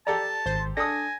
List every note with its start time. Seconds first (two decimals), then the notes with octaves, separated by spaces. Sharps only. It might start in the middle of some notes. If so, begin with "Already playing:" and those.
0.07 G4 A4 D5 A5 A#5
0.46 G#1 C5
0.77 D4 A4 G#5 D#6 A#6